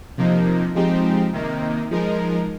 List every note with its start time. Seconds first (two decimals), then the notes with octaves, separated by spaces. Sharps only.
0.17 C3 F3 A#3 D#4
0.75 F3 G#3 C4 D#4 G4
1.33 C3 D#3 A#3 D#4
1.91 F3 G#3 D#4 A#4